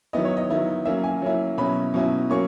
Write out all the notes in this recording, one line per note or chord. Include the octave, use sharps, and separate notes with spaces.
D#3 F#3 B3 E4 D#5
C#5
D#5
D#3 F#3 B3 E4
F#3 A#3 C#4 E4 E5
G#5
F#3 A#3 C#4 E4
B2 F#3 C#4 E4 B5
B2 F#3 C#4 E4
F#3 A#3 C#4 C#6